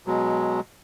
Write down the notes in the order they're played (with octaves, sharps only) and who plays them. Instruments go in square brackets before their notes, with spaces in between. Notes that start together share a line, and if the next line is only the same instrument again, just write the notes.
[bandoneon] B2 F#3 G#3